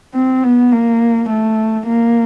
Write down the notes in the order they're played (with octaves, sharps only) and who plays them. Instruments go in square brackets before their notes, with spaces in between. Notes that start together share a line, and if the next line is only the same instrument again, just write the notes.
[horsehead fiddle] C4
B3
A#3
A3
A#3